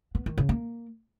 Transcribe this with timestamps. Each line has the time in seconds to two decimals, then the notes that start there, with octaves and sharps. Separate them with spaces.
0.15 B3
0.26 D#3
0.38 C#3
0.49 A#3